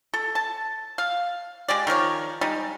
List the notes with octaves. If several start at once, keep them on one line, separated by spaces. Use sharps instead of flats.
A4
A5
F5
G#3 G4 D5
D#3 F3 A#4 C#5
G3 G#3 D#4